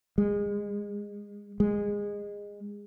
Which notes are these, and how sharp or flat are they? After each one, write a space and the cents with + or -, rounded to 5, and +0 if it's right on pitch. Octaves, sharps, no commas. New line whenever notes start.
G#3 -25
G#3 -20